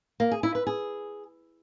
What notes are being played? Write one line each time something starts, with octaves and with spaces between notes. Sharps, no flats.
A#3
G#4
E4
B4
G#4